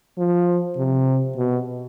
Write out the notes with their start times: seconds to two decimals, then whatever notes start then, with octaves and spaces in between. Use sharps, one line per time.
0.18 F3
0.78 C3
1.37 B2